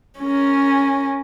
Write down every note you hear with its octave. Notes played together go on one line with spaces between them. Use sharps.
C#4 A#4